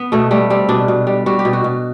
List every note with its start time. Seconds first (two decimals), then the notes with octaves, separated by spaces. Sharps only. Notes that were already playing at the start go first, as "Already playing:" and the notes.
Already playing: B3
0.12 B2 A3
0.31 G3 A3
0.50 G3 C4
0.69 B2 D4
0.88 B2
1.07 G3
1.26 G3 F#4
1.39 G4
1.45 B2
1.53 F#4
1.64 B2